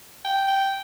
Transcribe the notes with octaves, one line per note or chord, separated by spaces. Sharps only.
G5
G5